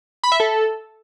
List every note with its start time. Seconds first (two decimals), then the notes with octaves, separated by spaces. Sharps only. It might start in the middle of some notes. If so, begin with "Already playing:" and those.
0.24 B5
0.32 E5
0.40 A4